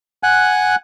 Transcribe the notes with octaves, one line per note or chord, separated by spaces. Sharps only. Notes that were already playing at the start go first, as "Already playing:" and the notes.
F#5 G#5 F#6